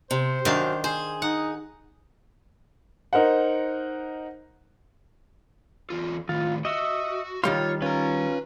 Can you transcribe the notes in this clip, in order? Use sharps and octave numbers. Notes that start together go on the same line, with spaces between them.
C3 C5
F#2 D#3 D4 F5
G#4 C5
D#4 F#5
D#4 A#4 C5 F#5
E2 F4
A2 D#3 F4
F#4 D#5 E5
D#3 G3 F4 C#5 F5 C6
C#4 F4 B4 A#5